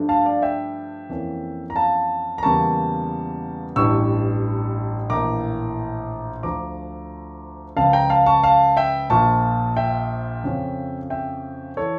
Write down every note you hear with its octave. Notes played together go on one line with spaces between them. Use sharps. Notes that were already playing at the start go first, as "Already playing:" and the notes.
Already playing: G2 F3 A3 D4
F5 A5
D5 F5
E5 G5
F2 E3 A#3 C#4
A#5
F5 A5
A#5
E2 C#3 G3 A#3 A5 C#6
A1 G2 E3 G3 C#6 E6
A#1 A2 E3 A#3 A#5 D6
D2 D3 F3 A#5 D6
C#2 C#3 F3 F5 A5
G5 A#5
F5 A5
A5 C#6
F5 A5
E5 G5
A#1 A#2 F3 A5 C#6
E5 G5
F2 C#3 F3 C#4
E5 G5
E3 A4 C#5